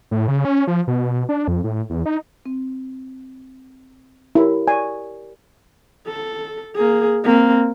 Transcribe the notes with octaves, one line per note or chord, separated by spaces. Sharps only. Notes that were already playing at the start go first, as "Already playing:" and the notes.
A2
C#3
C#4
F3
B2
D4
F2
A2
E2
D#4
C4
E4 G4 A#4 C#5
D5 G#5 C#6
A4
A#3 G#4
A#3 C4